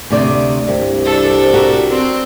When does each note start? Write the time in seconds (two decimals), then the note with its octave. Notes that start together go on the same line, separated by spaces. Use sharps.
0.11 D2 C3 D5
0.68 C2 G2
1.05 D4 A4
1.54 F#4 G4 A#4
1.90 C4